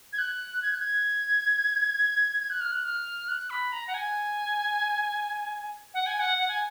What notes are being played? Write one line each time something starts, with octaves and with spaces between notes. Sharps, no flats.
G#6
F#6
G#6
F#6
G#6
G#6
F#6
F6
F#6
F6
F#6
B5
A#5
F#5
G#5
F#5
G#5
F#5
F#5
G#5